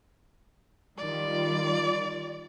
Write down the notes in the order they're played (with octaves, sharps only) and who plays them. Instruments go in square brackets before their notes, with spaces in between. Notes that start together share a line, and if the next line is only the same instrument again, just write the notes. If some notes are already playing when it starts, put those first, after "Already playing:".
[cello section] D#3 G3 F4 [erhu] D5